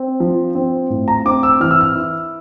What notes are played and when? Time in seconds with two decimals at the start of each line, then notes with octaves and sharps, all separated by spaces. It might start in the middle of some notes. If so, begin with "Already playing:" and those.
Already playing: C4
0.20 F3
0.55 C4
0.90 A2
1.08 A#5
1.25 C4 D6
1.43 E6
1.60 E3 F6
1.71 E6
1.81 F6
1.95 E4